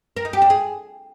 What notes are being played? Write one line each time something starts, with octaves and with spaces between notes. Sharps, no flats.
A#4
D#4
G4
D4
G#4